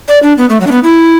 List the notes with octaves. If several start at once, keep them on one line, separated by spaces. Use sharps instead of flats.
D5
D4
B3
A3
F#3
D4
B3
E4